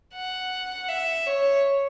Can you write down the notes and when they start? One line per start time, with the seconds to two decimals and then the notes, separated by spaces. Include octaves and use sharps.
0.15 F#5
0.89 E5
1.27 C#5